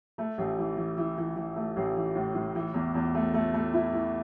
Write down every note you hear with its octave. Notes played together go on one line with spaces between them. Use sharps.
A3
A1
E3
E3
E3
E3
E3
A3
A1
E3
A2
A2
E3
E2
E2
A3
A3
A3
E4
E3